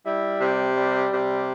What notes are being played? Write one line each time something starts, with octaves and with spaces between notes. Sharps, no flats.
G3 E4
C3
G3
C3